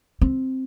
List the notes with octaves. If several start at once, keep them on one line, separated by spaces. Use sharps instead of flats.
C4